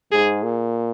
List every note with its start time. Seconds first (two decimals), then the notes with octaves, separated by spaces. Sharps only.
0.12 G#2 G#4
0.43 A#2